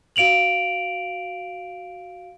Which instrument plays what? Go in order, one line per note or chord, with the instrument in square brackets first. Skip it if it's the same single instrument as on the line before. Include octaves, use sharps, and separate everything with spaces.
[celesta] F#4 F5 D7 F7 F#7